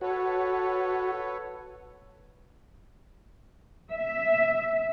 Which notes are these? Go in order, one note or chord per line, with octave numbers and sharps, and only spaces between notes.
F#4 A4 B4 C#5
E5